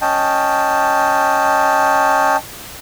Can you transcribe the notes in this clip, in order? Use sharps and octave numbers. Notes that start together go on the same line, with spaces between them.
C#4 D#5 G5 A5